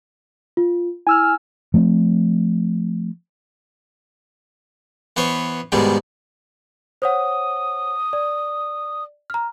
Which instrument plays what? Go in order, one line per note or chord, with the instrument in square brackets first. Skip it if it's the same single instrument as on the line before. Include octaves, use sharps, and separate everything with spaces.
[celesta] F4
[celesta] E4 [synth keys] G#5 E6 F6
[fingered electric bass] F3 A3 A#3 C4
[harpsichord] E3 B3 C5 C#5
G#2 B2 D#3 G3 G#3
[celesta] C5 C#5 F#5 [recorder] D#6
[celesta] D5
A#5 F6